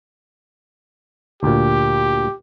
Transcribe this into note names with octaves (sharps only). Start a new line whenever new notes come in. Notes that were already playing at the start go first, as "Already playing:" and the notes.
D2 A#2 G4